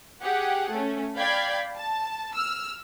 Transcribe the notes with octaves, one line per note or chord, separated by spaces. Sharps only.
G4 G#4 F#5
A3 C#4
D5 F5 G5 B5 G#6
A5
E6 F6